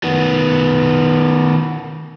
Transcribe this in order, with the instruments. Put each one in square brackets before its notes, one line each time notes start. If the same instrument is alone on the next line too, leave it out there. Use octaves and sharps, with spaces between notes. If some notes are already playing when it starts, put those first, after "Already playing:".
[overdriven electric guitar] D#3 B3